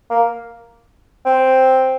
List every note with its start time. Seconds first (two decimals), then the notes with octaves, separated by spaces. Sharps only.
0.10 A#3
1.25 C4